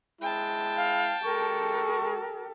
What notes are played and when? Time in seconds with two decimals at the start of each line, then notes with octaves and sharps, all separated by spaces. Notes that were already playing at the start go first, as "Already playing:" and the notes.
0.21 G#3 E4 G5 A5
0.76 F5
1.25 G#3 G4 A4 A#4 C#6